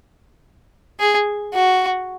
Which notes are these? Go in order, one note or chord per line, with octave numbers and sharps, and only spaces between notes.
G#4
F#4